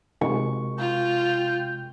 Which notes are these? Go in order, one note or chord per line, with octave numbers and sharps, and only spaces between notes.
C3 G#3 C#6
F4 G5